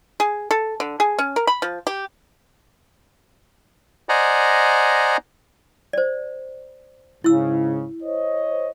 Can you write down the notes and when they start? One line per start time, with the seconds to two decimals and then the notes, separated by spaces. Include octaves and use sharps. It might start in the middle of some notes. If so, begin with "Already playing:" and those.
0.20 G#4
0.51 A4
0.80 D3
1.00 G#4
1.19 C#4
1.36 A#4
1.47 B5
1.62 F3
1.87 G4
4.09 C5 D5 D#5 F#5 G#5 A#5
5.93 C5 D5
7.24 G#2 C#3 E4 E6
8.03 C5 C#5 D#5